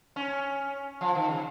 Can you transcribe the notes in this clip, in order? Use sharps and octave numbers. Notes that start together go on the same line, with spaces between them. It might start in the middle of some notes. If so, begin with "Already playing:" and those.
C#4
F3
D#3
C#3